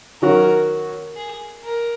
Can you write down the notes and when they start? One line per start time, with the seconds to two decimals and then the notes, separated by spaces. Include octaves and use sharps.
0.22 D#3 F#3 C#4 F#4 A#4
1.16 G#4
1.64 A#4